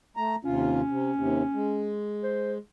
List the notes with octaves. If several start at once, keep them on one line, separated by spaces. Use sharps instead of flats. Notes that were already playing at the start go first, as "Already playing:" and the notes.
A3 A#5
D#2 C3 C#4 F4
C3
D#2 C3
G#3
C5